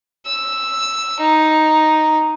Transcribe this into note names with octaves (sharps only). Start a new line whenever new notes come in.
E6
D#4